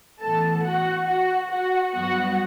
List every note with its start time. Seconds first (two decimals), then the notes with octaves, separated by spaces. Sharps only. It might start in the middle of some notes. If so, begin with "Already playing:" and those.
0.20 A2 E3 B3 A4 A5
0.64 F#4 F#5
1.06 F#4 F#5
1.50 F#4 F#5
1.93 G2 F#3 B3 F#4 F#5